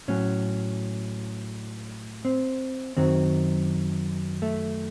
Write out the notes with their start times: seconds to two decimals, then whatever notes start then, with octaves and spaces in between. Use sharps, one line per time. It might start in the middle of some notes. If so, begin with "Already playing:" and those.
0.08 A2 F#3 C#4
2.25 C4
2.97 F#2 D#3 F#3 C4
4.42 A3